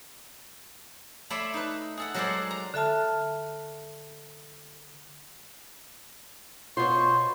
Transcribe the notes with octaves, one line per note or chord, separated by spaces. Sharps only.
A3 C#5 D5 E5 B5 C6
D#4 B4
G#4 A4 F#5
F#3 G#3 A4 A#4 C5 D5
A#5
D3 A4 E5 A5 F6
B2 B3 F4 C5 C#5 C6 C#6